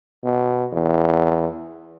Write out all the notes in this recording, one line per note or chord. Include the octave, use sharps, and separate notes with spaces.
B2
E2